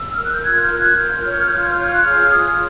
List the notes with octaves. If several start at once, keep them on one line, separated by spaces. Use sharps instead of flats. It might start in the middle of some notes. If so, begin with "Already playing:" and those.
Already playing: E6
A#4 F6
F#6
G6
F4 F#6 G#6
F#6
F6 G6
A#4
F#6 G#6
F4 F6 G6
C#5
F4
C#5
F#6
G#4 F6 G6
F4 D#6 F6